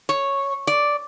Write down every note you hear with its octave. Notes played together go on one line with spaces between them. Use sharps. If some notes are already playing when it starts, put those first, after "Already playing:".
C#5
D5